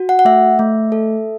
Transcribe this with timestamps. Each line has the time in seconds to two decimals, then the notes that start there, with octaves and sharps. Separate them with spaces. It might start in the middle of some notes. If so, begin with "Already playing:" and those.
Already playing: F#4
0.09 F#5
0.19 F#5
0.25 A3 E5
0.59 A3
0.92 A4